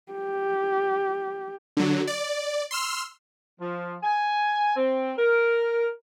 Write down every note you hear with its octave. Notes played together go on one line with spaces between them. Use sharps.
G4
D3 F#3
D5
C6 E6 F6
F3
G#5
C4
A#4